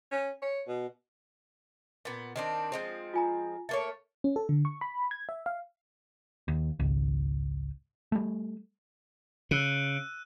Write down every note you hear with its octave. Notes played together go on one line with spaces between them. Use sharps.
C#4
C#5
B2
A#2 B3
D#3 C4 D4
F3 G#3 C4
F4 G#5 A#5
A3 A#3 C#5 A6
C#4
A4
D3
C#6
B5
G#6
E5
F5
D#2
G#1 C#2
G3 A3
C#3 E6 F#6 D#7